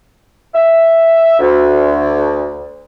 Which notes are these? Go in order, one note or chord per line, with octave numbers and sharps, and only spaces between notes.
E5
D2